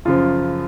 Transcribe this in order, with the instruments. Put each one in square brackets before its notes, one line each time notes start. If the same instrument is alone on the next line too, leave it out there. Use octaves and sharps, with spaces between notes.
[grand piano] F#2 C#3 F3 F4